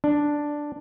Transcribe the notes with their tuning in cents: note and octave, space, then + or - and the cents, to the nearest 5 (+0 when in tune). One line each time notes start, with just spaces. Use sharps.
D4 +0